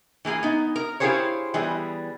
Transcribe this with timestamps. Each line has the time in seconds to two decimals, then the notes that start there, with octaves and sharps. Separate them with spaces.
0.25 E3 A#3 G#4 G#5
0.43 B3 D#4
0.76 A#4
1.00 E4 F4 G4 G#4 C5 C#5
1.54 E3 G3 B3 G#4